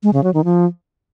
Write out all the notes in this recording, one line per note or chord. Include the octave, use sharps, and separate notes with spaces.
G#3
C#3
F#3
D#3
F3